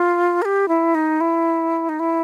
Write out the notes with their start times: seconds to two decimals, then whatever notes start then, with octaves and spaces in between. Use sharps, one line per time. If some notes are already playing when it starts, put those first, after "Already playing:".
Already playing: F4
0.42 A#4
0.45 G4
0.68 E4
0.95 D#4
1.21 E4
1.89 D#4
2.00 E4